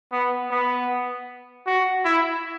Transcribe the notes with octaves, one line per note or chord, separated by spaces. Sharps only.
B3
B3
F#4
E4